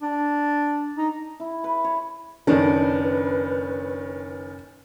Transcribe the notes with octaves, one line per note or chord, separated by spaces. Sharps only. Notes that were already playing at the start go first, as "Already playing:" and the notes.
D4
D#4
E4
B4
C#5
F#1 D#3 C#4 D4 A4 B4